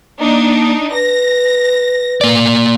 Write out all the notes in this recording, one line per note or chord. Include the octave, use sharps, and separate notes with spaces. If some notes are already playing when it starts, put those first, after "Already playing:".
A#3 D4 D#4
B4 A#6
A#3 D5